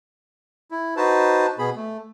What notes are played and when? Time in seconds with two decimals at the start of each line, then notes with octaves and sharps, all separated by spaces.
0.71 E4
0.97 D#4 F#4 B4 C5 A5
1.59 B2 B3 G#4 B5
1.76 A3